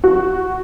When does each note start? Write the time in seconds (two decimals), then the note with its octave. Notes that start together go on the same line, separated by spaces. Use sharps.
0.04 F#4